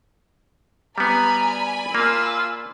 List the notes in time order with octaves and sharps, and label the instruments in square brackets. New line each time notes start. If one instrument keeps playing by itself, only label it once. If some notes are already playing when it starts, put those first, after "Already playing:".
[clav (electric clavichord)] G3 B3 [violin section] D5 G#5 B5 [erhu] A#5
[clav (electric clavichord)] A#3 [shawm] F4 [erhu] E6